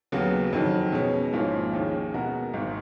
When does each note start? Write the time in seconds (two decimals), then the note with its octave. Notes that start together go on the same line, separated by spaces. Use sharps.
0.12 D#2 C#3 F#3 B3
0.53 F2 D#3 F#3
0.92 B2 G#3 C#4
1.33 G#1 G#2 F3 A#3 C#4
1.73 D#2 D#3 G#3 C#4
2.14 B2 G#3 B3 F#4 A#4
2.53 G#1 G#2 D#3